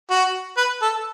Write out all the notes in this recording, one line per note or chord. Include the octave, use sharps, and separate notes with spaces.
F#4
B4
A4